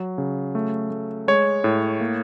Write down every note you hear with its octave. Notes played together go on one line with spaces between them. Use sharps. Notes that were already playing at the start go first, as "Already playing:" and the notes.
Already playing: F#3
C#3
A3
A3
G#3 C#5
A2
A#3